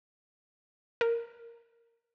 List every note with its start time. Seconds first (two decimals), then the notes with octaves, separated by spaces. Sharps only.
1.01 A#4